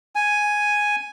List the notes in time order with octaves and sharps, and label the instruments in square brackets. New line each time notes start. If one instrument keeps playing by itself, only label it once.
[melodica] G#5